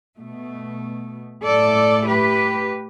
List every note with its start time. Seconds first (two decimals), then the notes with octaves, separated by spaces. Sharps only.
0.18 B2 A3
1.44 A2 A3 A4 D5
2.08 G4 B4